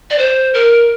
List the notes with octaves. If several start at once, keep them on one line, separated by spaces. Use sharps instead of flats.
D5
C5
A#4